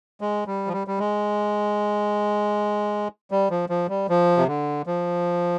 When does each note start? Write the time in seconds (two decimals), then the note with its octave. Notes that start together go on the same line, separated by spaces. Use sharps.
0.21 G#3
0.47 G3
0.67 F3
0.73 G3
0.87 G3
0.99 G#3
3.31 G3
3.50 F3
3.69 F3
3.89 G3
4.09 F3
4.37 C3
4.47 D3
4.87 F3